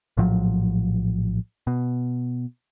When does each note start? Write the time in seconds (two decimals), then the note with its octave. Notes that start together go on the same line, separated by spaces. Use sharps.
0.17 A#1 A2 F3 F#3
1.67 B2